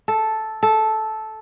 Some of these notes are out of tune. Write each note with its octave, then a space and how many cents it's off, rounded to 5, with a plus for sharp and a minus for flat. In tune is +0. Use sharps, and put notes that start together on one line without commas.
A4 -5
A4 -10